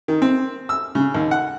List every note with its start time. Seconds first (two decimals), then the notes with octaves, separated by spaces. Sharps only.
0.08 D#3
0.22 C4
0.69 E6
0.95 C#3
1.15 D#2
1.31 F#5